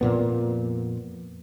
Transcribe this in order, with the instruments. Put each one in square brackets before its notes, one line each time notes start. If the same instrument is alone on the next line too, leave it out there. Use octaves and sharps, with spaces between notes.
[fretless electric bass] F2 A#2 B3